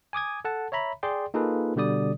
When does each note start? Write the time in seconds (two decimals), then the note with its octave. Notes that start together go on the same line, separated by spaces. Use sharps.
0.13 G#5 D6 D#6 G#6
0.45 A4 F#5 A5
0.72 C#5 E5 A#5 B5
1.03 G#4 D5 G5 C6
1.34 A#3 D#4 F4 G#4 A4 B4
1.76 B2 D3 G3 D5 D#6